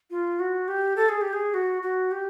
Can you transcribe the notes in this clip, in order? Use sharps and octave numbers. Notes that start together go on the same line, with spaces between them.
F4
F#4
G4
A4
G#4
G4
G#4
F#4
F#4
G4